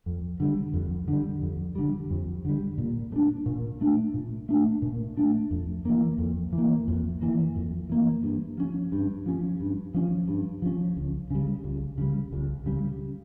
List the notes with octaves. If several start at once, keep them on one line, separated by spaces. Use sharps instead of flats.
F2
D3 G3
F2
D3 G3
F2
D3 G3
F2
D3 G3
A#2
A3
D4
A#2
A3 D4
A#2
A3 D4
A#2
A3 D4
F2
E3 A#3
F2
E3
A#3
F2
E3 A#3
F2
E3 A#3
G2
F3 C#4
G2
F3 C#4
G2
F3 C#4
G2
F3 C#4
C#2
C#3 G3
C#2
C#3 G3
C#2
C#3 G3